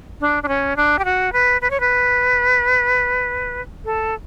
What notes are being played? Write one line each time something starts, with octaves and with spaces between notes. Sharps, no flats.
D4
D4
C#4
D4
G4
F#4
B4
B4
C#5
B4
A4